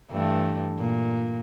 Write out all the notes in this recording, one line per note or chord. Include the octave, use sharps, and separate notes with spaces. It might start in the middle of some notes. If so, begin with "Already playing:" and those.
G2 E3 A3
A#2